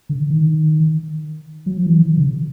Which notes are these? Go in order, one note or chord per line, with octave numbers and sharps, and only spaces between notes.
D3
D#3
F#3
F3
E3
D#3
C#3